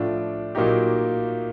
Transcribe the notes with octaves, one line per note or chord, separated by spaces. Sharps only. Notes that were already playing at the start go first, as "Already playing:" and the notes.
Already playing: A2 F3 A3 D4 F4
A#2 F#3 A#3 D#4 G4